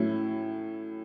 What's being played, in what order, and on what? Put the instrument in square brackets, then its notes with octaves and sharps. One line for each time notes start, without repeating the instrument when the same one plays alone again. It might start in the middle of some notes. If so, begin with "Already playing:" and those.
Already playing: [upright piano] A2 F#3 C#4 E4